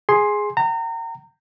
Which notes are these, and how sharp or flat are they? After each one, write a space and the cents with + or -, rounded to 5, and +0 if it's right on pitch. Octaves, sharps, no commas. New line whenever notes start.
G#4 +0 C6 +10
G5 -45 A#5 -30